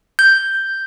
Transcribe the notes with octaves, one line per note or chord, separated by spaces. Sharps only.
G6